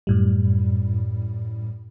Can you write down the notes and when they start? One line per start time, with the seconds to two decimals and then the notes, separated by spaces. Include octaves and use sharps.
0.07 F#2 A2 G3